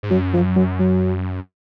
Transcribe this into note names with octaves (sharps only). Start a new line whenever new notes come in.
G#2
F#2 F#3
F3
F#3
F#3